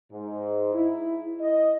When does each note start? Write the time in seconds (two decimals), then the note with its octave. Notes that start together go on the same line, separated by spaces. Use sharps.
0.12 G#2
0.74 E4
1.40 D#5